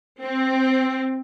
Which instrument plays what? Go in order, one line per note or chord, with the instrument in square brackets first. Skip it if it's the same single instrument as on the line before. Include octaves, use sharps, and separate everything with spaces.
[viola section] C4